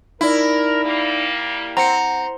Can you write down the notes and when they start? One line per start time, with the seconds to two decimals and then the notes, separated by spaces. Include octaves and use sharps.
0.21 D#4 E4 A#4 D5
0.84 G3 A#3
1.77 C4 F#5 A#5 C#7